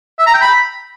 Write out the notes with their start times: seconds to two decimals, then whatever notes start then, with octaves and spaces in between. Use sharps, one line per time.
0.19 E5
0.27 A#5
0.34 G5
0.42 B5